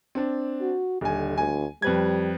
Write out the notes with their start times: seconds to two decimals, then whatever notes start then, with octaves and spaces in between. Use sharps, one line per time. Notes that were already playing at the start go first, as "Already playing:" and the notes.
0.15 C4 D4
0.61 F#4
1.01 D#1 D3 G#5
1.38 D2 G#5
1.82 F2 G3 B4 G#6